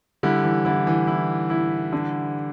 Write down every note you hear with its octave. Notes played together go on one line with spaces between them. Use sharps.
D3 G3 E4
E3
D3 E4
E3
E4
E4
D3